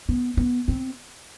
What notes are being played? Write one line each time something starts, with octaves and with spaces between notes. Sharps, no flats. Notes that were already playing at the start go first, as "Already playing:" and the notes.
B3
B3
C4